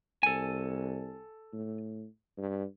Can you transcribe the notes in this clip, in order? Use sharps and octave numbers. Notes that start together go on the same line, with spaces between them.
C2 A4 G#5
A2
G2